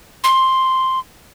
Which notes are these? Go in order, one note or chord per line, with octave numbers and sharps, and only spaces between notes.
C6